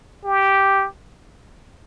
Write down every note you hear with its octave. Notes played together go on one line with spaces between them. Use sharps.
G4